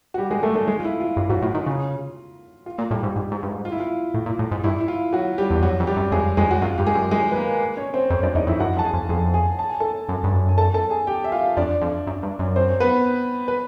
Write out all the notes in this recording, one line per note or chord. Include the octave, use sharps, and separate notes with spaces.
F#4
G3 G4
G#3 G#4
A3 A4
A3 A4
G#3 G#4
F4
E4
F4
G2 F4
G#2 F#3 F#4
A2 F4
D#3 F4
C#3
F4
A#2
A2 G3 G4
G#2
G#2
G#2
G2
G#2
F4
E4
F4
A2
A#2
A2
G#2
G2 E4
E4
F4
F#3 F#4
G3 G4
E2
F2 F#3 F#4
F2
G3 G4
F#2
F2 G#3 G#4
F2 G#3 G#4
F#4
F#2 F4
G2 G4
G#3 G#4
F#2
G#3 G#4
B4
A#3 A#4
C#4 C#5
C4 C5
F2 C4 C5
F#2 D4 D5
E2 D#4 D#5
F2 E4 E5
F#2 F#4 F#5
F2
A5
G#4 G#5
F2
F2 G#4 G#5
G#4 G#5
A5
G#5
A4 A5
F#2
G2
F#2
G#5
A4 A5
A4 A5
G#4 G#5
G4 G5
E5
F4 F5
F2 D4 D5
F2
F#2
G2
F#2
C4 C5
B3 B4
B4